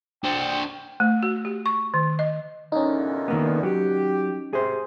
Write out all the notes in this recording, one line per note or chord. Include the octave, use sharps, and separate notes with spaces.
D4 C5 G5
A3
F#4
G4
C#6
D#3
D#5
E2 A#2 D3 C#4 D#4
D#3 A#3 B3
F#3 G4
C3 G#4 C5